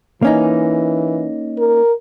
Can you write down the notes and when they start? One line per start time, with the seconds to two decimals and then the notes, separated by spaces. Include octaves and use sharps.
0.22 E3 A#3 C#4 D#4
1.58 A#4